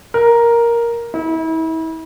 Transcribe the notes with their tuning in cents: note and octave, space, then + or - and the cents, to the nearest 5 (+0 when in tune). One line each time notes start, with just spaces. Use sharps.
A#4 +5
E4 -35